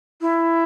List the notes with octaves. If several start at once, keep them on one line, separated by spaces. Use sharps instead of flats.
E4